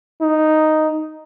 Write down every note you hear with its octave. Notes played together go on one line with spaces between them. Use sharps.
D#4